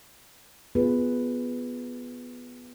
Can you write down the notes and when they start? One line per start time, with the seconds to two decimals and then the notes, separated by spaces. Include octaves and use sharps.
0.75 B3 F4 G#4 B4